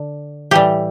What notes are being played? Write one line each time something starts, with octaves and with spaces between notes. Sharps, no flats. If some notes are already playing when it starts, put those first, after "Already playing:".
Already playing: D3
A2 E3 G3 G4